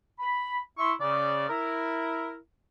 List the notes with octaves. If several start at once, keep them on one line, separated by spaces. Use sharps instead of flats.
B5
E4 E5 C6 C#6
C#3 D5
E4 A#4